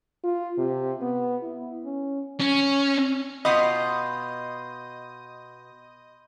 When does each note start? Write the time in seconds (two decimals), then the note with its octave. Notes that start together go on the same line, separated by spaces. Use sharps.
0.24 F4
0.58 C3
1.02 B3
1.42 E4
1.85 C#4
2.40 C#4
3.45 B2 B3 F4 D#5 B5 C6 D#6 G6